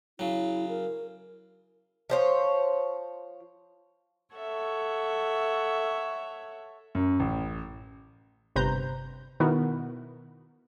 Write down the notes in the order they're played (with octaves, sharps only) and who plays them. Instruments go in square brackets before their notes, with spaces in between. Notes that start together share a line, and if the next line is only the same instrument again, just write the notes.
[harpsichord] C#3 F#3 [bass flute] E4
[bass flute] A#4
[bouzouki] F3 C5 C#5
[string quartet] A4 C#5 E5 F#5
[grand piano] F#2
A1
[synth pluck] G1 C3 B4 C5 A#5 G6
B2 D#3 B3 E4 F#4 A#4